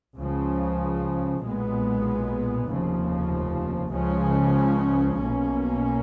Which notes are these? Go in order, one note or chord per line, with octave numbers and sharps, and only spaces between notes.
C#2 C#3 F3
B1 A#2 G#3 B3
F1 D#2 C#3 F3
C#2 C#3 F3 G#3 C#4
B1 B2 A#3 C#4